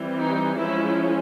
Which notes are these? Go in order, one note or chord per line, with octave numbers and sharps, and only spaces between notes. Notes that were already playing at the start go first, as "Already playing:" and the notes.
Already playing: E3 G3 C4
D#4
F3 G#3 C#4 E4